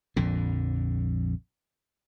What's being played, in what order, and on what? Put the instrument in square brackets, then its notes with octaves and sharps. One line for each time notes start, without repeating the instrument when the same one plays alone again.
[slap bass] A#1 F2 D3